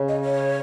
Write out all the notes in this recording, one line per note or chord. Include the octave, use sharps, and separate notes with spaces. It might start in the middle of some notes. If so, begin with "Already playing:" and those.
Already playing: C#3
D#5
C#5